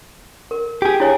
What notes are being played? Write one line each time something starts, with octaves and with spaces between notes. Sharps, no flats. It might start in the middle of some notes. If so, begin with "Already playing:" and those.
A#4
G4 G#4
E4 C#5 G#5